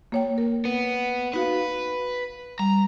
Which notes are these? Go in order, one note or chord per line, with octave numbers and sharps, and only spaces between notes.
A#3 C#5 G5
A#4
B3
D#4 F#4 B4 F5
G3 A#5